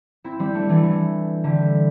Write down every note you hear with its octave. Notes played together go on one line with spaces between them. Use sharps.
C4 E4
G3 C4
A3 D4
E3 A3
E3 A3
D3 G3